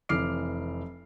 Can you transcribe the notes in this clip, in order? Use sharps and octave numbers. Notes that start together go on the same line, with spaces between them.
F1 E3 D6 F6 C7 D7